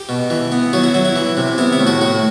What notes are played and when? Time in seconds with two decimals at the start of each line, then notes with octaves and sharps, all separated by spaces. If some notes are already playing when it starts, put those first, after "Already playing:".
Already playing: G4
0.09 B2
0.30 E3
0.52 B3
0.73 F#3 F#4
0.84 E4
0.94 F#3 E4
1.05 E4
1.16 E3
1.37 C3
1.58 B3 E4
1.73 E4
1.80 A2
1.87 F#4
2.01 A2 F#4